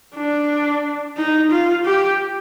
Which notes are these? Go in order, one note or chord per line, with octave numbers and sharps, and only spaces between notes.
D4
D#4
F4
G4